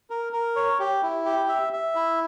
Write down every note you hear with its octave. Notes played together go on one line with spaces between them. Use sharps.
A#4
A#4
C#5
G4
E4
G4
E5
E5
E4